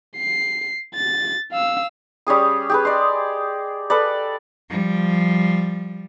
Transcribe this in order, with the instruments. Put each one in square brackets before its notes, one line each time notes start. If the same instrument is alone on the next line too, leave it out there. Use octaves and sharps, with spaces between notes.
[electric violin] C7
A6
F5 E6
[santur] G3 C#4 G#4 D#6
G4 G#4 B4
D5 D#5 C6
A4 B4 D5
[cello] F3 G3